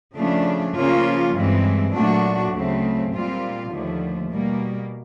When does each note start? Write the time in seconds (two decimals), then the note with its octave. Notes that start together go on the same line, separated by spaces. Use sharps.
0.16 C#3 F3 A3 D4
0.76 C#3 F3 A#3 C#4 F4
1.35 G2 E3 G#3 C4
1.94 A#2 F#3 A3 D4 F#4
2.53 D2 C#3 F#3 A3 C4
3.12 A#2 G3 C4 F4
3.71 D#2 D3 F3 A3
4.31 B2 G3 A#3